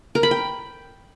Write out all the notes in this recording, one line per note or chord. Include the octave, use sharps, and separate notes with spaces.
A#4
B5
G5